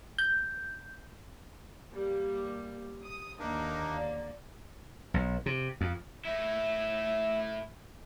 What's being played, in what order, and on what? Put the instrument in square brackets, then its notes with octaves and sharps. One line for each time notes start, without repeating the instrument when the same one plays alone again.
[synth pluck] G6
[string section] G3 A#3
D#6
[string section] D#2 D3 A#3 [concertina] D4 D#4 A#4
[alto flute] D5
[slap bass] B1
C3
F2
[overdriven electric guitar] A3 E4 [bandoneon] E5